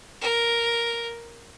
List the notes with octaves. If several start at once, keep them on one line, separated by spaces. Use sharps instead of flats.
A#4